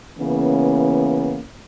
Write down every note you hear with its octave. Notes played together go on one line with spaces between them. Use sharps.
C#3 E3 A#3 B3 C#4